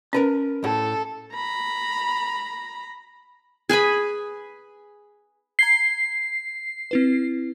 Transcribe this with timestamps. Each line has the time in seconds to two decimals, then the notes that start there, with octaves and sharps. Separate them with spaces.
0.13 C#4 A#4 B4 A5
0.64 A2 A4
1.34 A#5 B5
3.69 G#4 B4 G#5 B5
5.59 A#5 G#6 C7 G7
6.91 C4 E4 B4